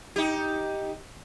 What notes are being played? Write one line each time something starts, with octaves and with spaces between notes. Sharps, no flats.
D#4 G4